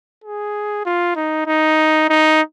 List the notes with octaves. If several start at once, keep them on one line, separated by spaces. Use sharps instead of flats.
G#4
F4
D#4
D#4
D#4